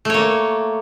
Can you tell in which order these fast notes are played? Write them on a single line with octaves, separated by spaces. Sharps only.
A3 C#5 A#3